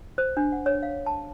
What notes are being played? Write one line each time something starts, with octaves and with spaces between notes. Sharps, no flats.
C5
D4
F#5
C#5
F5
A5